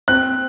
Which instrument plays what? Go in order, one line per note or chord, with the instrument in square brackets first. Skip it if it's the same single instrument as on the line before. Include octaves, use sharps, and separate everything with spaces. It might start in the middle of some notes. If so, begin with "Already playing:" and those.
[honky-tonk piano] C4 [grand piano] F#6